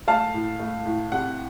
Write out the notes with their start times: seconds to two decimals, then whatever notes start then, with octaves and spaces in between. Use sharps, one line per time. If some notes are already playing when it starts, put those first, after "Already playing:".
0.07 A3 F5 A5
0.34 A2
0.60 A3
0.86 A2
1.12 C3 F#5